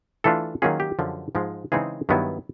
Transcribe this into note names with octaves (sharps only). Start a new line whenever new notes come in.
E3 A3 D4 F4 A4
D#3 F#3 A#3 C#4 F4 G#4
G4
F#2 D3 F3
G#2 F3 G#3
C#3 E3 G#3 C4 D#4 G#4
G2 D#3 F#3 B3 E4